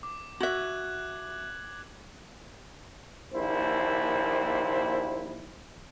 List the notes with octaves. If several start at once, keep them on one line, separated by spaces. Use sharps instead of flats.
D6
F#4 E5 F#6 G#6 F#7
A#1 D#2 E4 C5